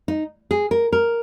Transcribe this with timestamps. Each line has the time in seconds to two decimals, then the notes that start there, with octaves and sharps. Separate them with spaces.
0.08 D#4
0.51 G#4
0.71 A#4
0.93 A#4